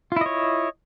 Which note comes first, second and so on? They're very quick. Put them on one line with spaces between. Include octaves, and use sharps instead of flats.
F4 E4 D#5 C#5